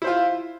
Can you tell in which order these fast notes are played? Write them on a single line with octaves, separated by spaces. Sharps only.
E4 C5 F4